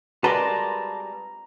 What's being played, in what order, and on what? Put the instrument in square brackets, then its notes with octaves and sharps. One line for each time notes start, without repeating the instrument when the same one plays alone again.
[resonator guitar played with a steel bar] G3 G#3 F#4 [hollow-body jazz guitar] B4 [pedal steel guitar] A5 C6 D6 [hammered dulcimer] A#5